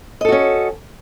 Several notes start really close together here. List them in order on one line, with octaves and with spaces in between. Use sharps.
D#5 A4 F#4 C#4